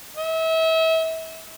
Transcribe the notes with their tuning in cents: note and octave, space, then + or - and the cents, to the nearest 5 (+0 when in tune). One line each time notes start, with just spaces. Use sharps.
E5 -35